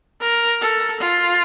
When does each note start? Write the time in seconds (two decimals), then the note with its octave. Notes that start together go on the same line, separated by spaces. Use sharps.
0.21 A#4
0.61 A4
1.01 F4